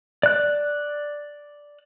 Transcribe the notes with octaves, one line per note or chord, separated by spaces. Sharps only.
D5 F#6